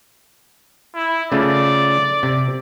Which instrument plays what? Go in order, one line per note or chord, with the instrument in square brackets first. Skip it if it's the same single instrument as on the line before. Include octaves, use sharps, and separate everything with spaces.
[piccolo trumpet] E4
[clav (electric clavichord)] C#3 A3 F4 [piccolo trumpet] D5
[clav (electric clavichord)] C3